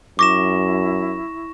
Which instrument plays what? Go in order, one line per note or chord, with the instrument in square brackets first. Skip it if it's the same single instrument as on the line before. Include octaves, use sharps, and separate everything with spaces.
[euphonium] F#2 [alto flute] E4 [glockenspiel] C#6 A#6 E7 [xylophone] D6